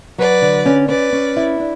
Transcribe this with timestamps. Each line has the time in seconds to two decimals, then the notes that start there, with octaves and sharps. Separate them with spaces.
0.18 F#3 B4 D5
0.42 D3
0.66 C#4
0.88 C#4 B4 D5
1.13 C#4
1.37 E4
1.60 D4